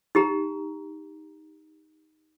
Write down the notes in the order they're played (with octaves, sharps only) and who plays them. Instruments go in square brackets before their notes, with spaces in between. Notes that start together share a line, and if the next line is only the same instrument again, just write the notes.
[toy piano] D#4 G4 A#5